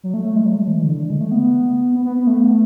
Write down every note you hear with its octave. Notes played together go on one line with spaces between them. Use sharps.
F#3
A3
A3
G#3
F#3
G#3
E3
D3
D3
G#3
A3
B3
B3
B3
B3
A3